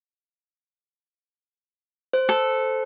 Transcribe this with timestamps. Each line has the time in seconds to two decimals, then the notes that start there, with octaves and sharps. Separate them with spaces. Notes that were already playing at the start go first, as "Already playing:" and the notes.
2.13 C5
2.29 A4